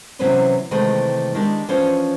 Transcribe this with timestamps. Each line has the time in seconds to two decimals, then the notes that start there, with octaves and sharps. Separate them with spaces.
0.19 C3 E3 F#3 C#4 B4 C5
0.71 C3 D#3 E3 G#3 A3
1.35 D#3 G#3 D4 G4
1.68 E3 F3 C#4 D4 C5 C#5